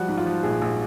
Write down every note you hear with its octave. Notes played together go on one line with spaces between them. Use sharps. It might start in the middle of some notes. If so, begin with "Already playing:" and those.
Already playing: F3 G3 F#4
G#2
F4
F3
A#1 G#4
A#1